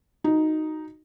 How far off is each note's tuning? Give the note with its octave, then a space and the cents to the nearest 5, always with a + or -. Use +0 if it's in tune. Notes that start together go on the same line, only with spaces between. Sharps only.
D#4 +0 F#4 +0